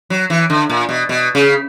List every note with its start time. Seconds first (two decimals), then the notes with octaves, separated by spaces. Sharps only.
0.10 F#3
0.30 E3
0.50 D3
0.70 A#2
0.89 B2
1.09 B2
1.35 C#3